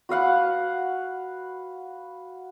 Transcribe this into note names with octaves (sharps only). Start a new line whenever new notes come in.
F#4 B4 F5 F#5